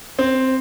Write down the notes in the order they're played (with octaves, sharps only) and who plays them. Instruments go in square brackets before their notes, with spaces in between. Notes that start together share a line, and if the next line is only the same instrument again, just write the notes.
[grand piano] C4